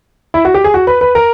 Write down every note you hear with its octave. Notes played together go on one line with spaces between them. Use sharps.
E4
F#4
G4
G#4
F#4
B4
B4
A#4